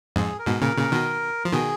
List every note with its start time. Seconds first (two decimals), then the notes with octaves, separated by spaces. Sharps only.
0.16 F2 G#2 G#4
0.39 A#4
0.46 G#2 B2
0.61 A#2 C#3 A#4
0.76 A#2 C#3
0.92 B2 D#3
1.45 F3
1.53 B2 D#3 G#4